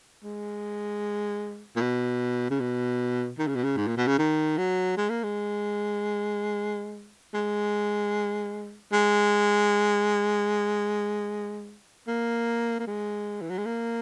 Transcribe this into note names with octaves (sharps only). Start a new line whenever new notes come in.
G#3
A#2
B2
C#3
B2
D#3
C#3
B2
C#3
G#2
A#2
B2
C#3
D#3
F#3
G#3
A#3
G#3
G#3
G#3
A#3
A#3
G#3
E3
F#3
G#3
A#3